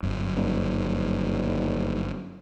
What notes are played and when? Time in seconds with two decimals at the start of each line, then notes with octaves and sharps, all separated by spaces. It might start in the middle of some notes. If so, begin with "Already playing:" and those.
0.03 G1 F#2
0.36 D#1